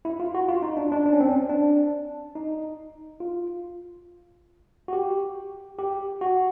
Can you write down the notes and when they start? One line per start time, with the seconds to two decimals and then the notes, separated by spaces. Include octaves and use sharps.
0.05 E4
0.20 F4
0.35 F#4
0.49 F4
0.62 D#4
0.77 D4
0.92 D4
1.06 D4
1.13 C#4
1.20 C4
1.28 C#4
1.49 D4
2.35 D#4
3.20 F4
4.88 F#4
4.93 G4
5.79 G4
6.21 F#4